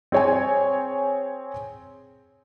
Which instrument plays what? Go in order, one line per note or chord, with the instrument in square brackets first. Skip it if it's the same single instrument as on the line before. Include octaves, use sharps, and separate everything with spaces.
[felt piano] C4 G#4 C#5 G5 G#5